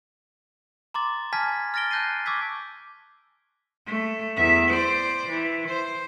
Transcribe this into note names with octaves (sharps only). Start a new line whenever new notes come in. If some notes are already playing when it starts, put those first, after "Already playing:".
A#5 C6 D6 A6
G#5 A5 F6 G#6 B6
F6 A6 A#6 D7 G7
A5 F#6 G6 A#6 C7 D#7
C#6 D6 E6 G#6 B6
A3
E2 E5
C5 D5
E3
C5